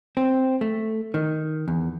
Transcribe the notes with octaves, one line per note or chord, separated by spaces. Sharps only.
C4
A3
D#3
E2